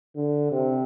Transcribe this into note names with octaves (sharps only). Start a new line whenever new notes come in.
D3
C3